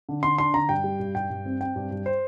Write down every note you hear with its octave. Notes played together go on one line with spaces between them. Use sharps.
D3
D3 C6
D4 C6
D3 A#5
G2 G5
G3
G2
G2 G5
G2
C4
C4 G5
G2
G2
C5